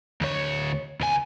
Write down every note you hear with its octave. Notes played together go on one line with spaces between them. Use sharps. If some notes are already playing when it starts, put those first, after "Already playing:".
D2 C#5
C#2 G#5